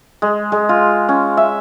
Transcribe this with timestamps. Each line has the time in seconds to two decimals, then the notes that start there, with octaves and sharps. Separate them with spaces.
0.22 G#3
0.52 G#3
0.69 F4
1.09 C#4
1.37 E5